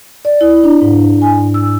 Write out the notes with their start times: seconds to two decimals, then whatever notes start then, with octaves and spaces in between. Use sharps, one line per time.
0.25 D5
0.41 E4
0.64 D4
0.82 G#2
1.22 G#5
1.54 E6